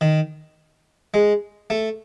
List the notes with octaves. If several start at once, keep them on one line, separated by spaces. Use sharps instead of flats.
D#3
G#3
A3